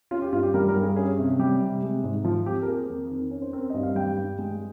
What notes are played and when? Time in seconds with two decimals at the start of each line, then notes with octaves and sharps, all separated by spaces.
0.11 C#4 F4
0.22 G4
0.33 G2 F4
0.43 G4
0.54 G3 A#4
0.68 A#4
0.75 G2
0.82 G#4
0.96 C#4 G#4
1.18 C3
1.39 G3 G4
1.61 C3
1.82 G#3
2.04 G#2
2.24 F3 F4
2.46 C4 G4
2.62 A#4
2.68 A#3 G#4
2.89 F2
3.10 D#3
3.31 C#4
3.42 C5
3.53 C4 A#4
3.70 G2 D#5
3.83 F5
3.95 G3 G5
4.17 G2
4.38 G#3